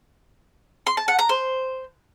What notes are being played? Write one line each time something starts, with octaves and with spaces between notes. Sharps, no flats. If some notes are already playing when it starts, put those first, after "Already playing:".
C6
A5
F#5
A#5
C5